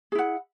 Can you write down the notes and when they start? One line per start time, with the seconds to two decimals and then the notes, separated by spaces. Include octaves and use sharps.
0.12 G#4
0.15 E4
0.19 F#5